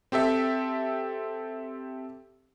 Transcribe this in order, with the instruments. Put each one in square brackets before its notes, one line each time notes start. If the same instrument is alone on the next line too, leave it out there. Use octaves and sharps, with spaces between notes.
[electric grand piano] C4 G4 A4 E5